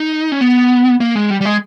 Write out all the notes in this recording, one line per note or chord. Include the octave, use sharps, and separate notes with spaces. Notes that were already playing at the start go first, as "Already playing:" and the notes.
Already playing: D#4
C#4
B3
A#3
G#3
G3
G3
G#3